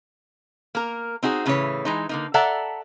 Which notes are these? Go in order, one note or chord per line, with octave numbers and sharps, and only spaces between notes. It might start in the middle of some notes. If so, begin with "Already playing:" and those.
A#3 A#4
C4 D#4 F#4 G#4
A2 C#3 E3 D#4 B4 C#5
E3 G#3 D#4
D3 A#3 D#4
A4 D5 E5 F#5 A5 A#5